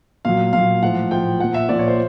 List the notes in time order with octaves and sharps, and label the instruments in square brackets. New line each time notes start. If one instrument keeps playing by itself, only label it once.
[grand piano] A#2 F#3 F5
A#2 F#3 F5
A2 F3 F#5
A2 F3 G5
A#2 F3 F#5
E5
A#2 F3 D5
C#5
C5